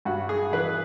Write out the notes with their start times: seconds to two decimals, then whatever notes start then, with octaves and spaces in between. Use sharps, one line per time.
0.05 G2 F#4
0.29 G#4
0.52 E3 B4